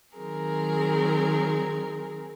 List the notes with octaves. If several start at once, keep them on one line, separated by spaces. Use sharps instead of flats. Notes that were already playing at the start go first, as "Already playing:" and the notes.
D#3 F#3 C4 G#4 A#4